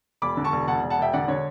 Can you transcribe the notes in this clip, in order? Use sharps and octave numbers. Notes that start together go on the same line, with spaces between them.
E1 B5 D6
D3
A5 C#6
E1
E1 F#5 A5
E1
F#5 A5
E1 E5 G5
D3 D5 F#5
D3 C#5